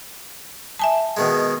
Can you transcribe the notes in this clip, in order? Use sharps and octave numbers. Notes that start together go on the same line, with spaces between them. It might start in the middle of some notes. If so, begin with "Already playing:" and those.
E5 G#5 A5
B2 D#3 G#3